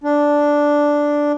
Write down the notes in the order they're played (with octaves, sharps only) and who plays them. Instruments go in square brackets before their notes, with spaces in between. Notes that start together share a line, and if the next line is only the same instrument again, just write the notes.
[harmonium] D4